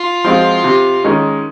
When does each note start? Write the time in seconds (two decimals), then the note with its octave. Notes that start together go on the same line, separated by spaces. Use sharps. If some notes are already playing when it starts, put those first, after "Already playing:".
Already playing: F4
0.24 F3 G#3 C4 F#4
0.64 C3
1.04 D#3 G#3 C#4